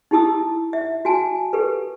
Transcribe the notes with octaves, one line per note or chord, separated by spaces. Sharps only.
D#4 E4 G4 A5 D#6 E6
E5
F#4 G#5 A5
G4 A4 B4